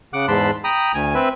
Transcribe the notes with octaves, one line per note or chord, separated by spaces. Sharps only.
C#3 F#5 D6 F#6
E2 G#2 A5 B5 C6 F#6
G5 A#5 B5 D#6
D2 G#5
C4 B4 E5